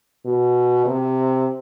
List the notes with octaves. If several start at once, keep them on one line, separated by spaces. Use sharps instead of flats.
B2
C3